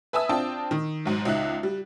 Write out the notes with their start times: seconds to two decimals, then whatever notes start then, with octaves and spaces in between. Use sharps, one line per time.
0.13 B4 E5 G#5 A5 D#6 E6
0.29 C4 D4 F4 G5 A5
0.71 D#3
1.05 B1 G#2
1.25 C#2 D#4 E5 F#6
1.63 G3